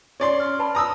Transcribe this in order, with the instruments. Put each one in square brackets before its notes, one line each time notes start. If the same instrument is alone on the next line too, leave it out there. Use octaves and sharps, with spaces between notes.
[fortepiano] C#4 D5 C6
[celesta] F6
B4 A5 B5
[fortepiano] A#5 D#6 E6